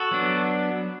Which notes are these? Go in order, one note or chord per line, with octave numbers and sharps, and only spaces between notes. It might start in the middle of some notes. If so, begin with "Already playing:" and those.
Already playing: F#4 A4
F#3 B3 D4